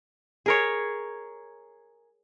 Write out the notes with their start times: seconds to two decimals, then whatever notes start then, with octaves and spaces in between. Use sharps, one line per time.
0.46 G#4 A#4 C#5